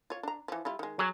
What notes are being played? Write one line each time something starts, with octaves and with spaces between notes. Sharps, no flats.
F4 C#5
D4 A#5
E3 F3
G3 E4 F4
D#3 G#3
F#3 G#4 C#5